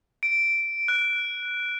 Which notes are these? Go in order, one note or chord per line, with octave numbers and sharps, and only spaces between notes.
D7
F#6